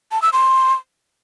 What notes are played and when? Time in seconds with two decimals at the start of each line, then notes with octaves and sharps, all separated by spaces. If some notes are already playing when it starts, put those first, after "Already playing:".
0.11 A5
0.22 E6
0.33 C6